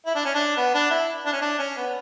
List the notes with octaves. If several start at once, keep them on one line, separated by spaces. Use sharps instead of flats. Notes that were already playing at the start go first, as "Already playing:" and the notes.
E4
D4
C#4
D4
B3
D4
E4
D4
C#4
D4
C#4
B3